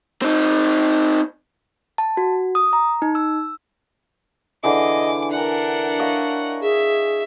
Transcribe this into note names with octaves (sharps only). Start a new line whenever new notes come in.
C4 D#4
A5
F#4
D#6
A#5
D#4
E6
D3 E3 G#4 D#5 D6
D4 A#4 F#5
C#5 D#5 F5
G#4 E5